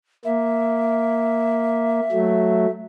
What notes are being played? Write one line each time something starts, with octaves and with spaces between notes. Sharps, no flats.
A#3 E5
F#3 A3